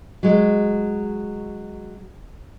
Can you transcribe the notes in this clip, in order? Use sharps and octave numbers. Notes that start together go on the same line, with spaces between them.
F#3 G#3